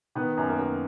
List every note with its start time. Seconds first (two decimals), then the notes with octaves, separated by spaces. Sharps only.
0.15 D#3 B3
0.37 F#2
0.49 A#3
0.59 F#2